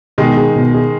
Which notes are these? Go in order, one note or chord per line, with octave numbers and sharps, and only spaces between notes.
B2 D#3 G#3
G#4
B2
G#4